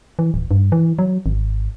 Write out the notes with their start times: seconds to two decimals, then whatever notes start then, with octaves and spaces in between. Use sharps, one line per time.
0.19 E3
0.34 D1
0.51 G2
0.72 E3
0.99 F#3
1.26 G#1